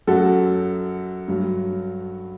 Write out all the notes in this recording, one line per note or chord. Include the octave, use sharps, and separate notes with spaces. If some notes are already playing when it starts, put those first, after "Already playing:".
F#2 F#3 F#4 A4
G2 F#3